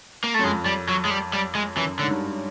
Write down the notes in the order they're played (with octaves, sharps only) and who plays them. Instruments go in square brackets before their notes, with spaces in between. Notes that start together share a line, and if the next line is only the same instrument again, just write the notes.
[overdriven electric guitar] A#3
A3
[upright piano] F#2
[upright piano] F2 [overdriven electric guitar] G#3
[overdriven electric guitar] G3
F#3
G#3
G3
G3
G#3
[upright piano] F#2 [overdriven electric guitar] E3
[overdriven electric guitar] D3
[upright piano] G#2
G2